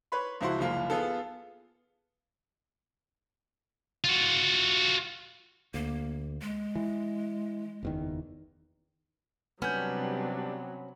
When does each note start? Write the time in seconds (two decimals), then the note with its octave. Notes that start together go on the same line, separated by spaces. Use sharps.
0.12 B4 C#5 B5 C6
0.41 C#2 F3 E4 F#4 C6
0.58 F#1 C2 F3 A#3 F4
0.90 B3 F4 G#4 A4
4.04 F4 F#4
5.74 D2 A#3
6.42 G#3
6.75 E3
7.83 F#1 E2 D#3
9.62 C3 F#3 G3 B3 C#4 D4 G6